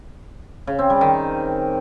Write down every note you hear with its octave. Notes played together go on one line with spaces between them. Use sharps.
C#3
C4
G3
D#3